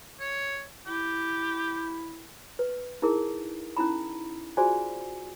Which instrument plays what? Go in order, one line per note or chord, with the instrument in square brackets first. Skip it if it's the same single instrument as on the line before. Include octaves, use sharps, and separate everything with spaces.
[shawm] C#5
[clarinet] E4 [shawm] G4
[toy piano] B4
D#4 E4 G#4 A#4
C#4 D#4 E4 A#5 B5
F4 F#4 G#4 C5 D5 G#5